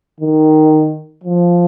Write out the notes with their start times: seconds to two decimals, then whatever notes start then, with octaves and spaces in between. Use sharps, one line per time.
0.20 D#3
1.24 F3